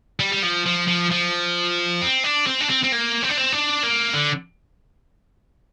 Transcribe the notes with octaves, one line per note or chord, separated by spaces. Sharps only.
G3
G3
F3
F3
F3
F3
C4
D4
C4
D4
C4
C4
A#3
C4
D4
C4
D4
A#3
D3